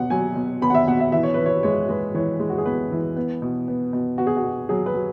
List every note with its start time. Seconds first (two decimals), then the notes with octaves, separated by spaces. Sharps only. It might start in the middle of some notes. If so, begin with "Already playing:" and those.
Already playing: B2 B3 F#5
0.10 F#3 G#5
0.36 B2
0.61 B3 B5
0.70 F#5
0.74 E5
0.87 B2 F#5
1.00 E5
1.12 E3 E5
1.23 C#5
1.34 E3 B4
1.46 C#5
1.63 G#3 C#5
1.89 G#3 B4
2.14 E3 C#5
2.40 G#3
2.50 F#4
2.58 G#4
2.65 B3 B4
2.92 E3
3.16 B3
3.42 B2
3.68 B3
3.93 B2
4.18 B3 F#4
4.27 G#4
4.37 F#4
4.43 B2
4.69 F#3 G#4
4.86 B4
4.94 F#3